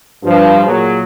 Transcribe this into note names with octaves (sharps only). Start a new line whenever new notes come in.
G2 F3
A#2 F#3 G#4